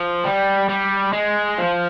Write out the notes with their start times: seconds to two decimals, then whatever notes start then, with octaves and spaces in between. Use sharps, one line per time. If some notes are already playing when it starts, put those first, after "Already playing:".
Already playing: F3
0.24 G3
0.69 G3
1.13 G#3
1.58 F3